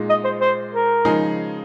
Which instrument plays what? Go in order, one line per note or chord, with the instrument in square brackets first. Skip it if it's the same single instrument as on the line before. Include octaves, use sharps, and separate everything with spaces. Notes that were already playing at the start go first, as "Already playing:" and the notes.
Already playing: [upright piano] A#2 G#3 D#4
[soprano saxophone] D#5
C5
C5
A#4
[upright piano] C#3 F3 G#3 D#4 G#4